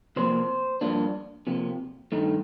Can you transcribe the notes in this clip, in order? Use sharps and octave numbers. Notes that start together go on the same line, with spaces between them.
C3 F3 A#3 C5
G2 F3 A#3 D4
C3 F3 A#3
G2 D#3 A3 D#4